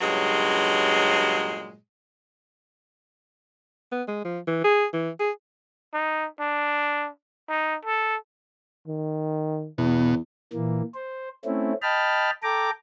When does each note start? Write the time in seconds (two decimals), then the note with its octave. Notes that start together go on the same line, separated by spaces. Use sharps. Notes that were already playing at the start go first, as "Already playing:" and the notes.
0.01 G2 A#2 C#3 F#3 G#3
3.92 B3
4.08 G#3
4.24 F3
4.47 E3
4.64 G#4
4.93 E3
5.20 G#4
5.94 D#4
6.40 D4
7.49 D#4
7.85 A4
8.88 D#3
9.78 E2 B2
10.53 A#2 E3 A#3
10.95 C5
11.45 A3 C4 C#4 E4
11.82 D#5 G5 A5 B5 F6
12.43 A4 G5 A#5 D6